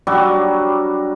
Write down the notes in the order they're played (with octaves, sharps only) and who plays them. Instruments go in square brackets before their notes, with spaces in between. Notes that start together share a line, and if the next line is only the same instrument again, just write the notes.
[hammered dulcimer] F#3 G3 D4 C#5